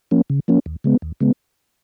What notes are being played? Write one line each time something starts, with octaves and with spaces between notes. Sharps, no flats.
F3 A#3 C#4
C#3
F3 A#3 C#4
D#2
C#3 G#3 B3
D#2
C#3 G#3 B3